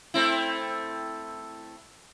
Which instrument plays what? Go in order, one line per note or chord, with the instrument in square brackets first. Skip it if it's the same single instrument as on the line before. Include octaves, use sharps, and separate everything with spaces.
[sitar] A3 C4 E4